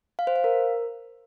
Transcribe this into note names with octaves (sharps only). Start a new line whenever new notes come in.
F5
C5
F5
A#4